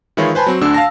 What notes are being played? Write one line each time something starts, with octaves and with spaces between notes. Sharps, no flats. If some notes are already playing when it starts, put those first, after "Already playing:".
D#3 E3 G#3 E4 F4 C#5
B4 C5 G#5 A5 B5
F#3 C4
D2 D3 D4 E6
F5 A5 A#6